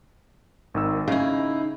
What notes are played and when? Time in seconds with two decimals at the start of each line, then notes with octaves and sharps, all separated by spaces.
0.74 G#1 D#3 E6
1.08 C#3 C#4 D#4 E4 F5